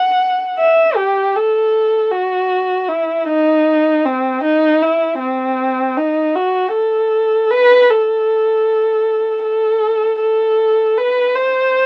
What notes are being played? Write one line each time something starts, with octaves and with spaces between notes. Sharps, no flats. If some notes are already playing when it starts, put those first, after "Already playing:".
Already playing: F#5
E5
G4
A4
F#4
E4
D#4
C4
D#4
E4
C4
D#4
F#4
A4
B4
A4
A4
A4
B4
C5